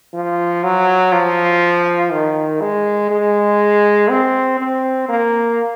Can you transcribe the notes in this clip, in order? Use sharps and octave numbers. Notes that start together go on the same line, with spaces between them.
F3
F#3
F3
D#3
G#3
G#3
C4
C4
A#3